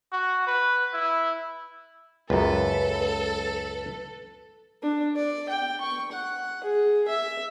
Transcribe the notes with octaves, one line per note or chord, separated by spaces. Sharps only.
F#4
B4
E4
C#2 F#2 A4 B4
D4
D5
G5
C#6
F#5
G#4
E5